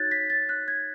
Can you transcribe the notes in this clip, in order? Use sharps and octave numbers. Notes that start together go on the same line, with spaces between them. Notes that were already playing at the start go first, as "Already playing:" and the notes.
Already playing: D#4 F#4 C#5 F#6 G#6 A6
B6
A6
F#6
G#6